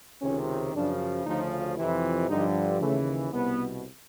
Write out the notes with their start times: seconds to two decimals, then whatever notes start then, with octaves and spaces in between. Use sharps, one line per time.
0.21 C#2 C3 D#3 C#4
0.73 F#2 C#3 F3 D4
1.25 D2 C#3 F3 D#4
1.77 F2 C3 E3 E4
2.28 G2 D3 F3 D#4
2.80 D#2 C#3 E3 A3
3.32 C2 B2 B3